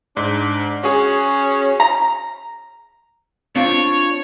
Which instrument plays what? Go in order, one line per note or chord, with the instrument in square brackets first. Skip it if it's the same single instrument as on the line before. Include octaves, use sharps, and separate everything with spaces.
[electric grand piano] G#2 [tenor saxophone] D4
[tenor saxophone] C#4 [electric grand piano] F#4 G#4
[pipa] A#5
[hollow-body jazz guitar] C4 D4 F4 [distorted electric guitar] C#5